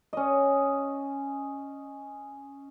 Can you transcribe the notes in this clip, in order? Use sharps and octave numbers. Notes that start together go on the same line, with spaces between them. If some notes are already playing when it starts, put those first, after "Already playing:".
C#4 D#5